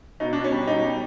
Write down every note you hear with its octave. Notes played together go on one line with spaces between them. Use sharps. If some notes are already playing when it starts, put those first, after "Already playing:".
B2 D#4
D4
B2
C#4
G3
B2 D#4
G3